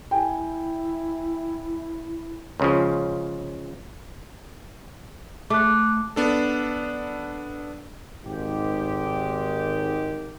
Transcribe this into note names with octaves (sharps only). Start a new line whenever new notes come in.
E4 G5 G#5
C#2 C#3 F3
A3 D6 F#6
B3 D4 A4
G#1 G#2 D#3 G4